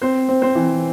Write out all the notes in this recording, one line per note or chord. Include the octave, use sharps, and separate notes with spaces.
C4 C5
C4
C4 C5
E3